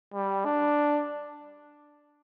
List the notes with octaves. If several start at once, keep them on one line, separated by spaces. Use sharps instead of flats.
G3
D4